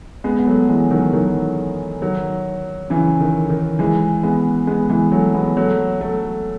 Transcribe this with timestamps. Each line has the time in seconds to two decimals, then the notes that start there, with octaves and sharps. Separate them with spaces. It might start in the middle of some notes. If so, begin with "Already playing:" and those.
0.24 G#3 B3
0.39 B3
0.46 F#3 A3
0.69 E3 G#3
0.90 D#3 F#3
1.13 D#3 F#3
2.02 D#3 F#3
2.90 C#3 E3
3.20 D#3
3.49 D#3
3.79 E3 G#3
4.23 G#3 B3
4.67 G#3 B3
4.90 E3 G#3
5.12 F#3 A3
5.34 G#3 B3
5.57 F#3 A3
6.01 F#3 A3